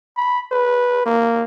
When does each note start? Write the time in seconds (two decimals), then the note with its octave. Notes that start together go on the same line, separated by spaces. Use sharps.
0.17 B5
0.52 B4
1.06 A#3